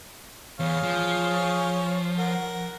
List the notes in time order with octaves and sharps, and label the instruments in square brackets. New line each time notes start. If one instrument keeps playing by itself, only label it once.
[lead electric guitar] E2 [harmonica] G#4 C#5 F5
[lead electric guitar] F3
[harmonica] A#4 F#5